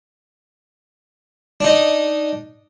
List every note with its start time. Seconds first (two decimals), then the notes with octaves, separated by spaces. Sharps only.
1.60 D4 D#4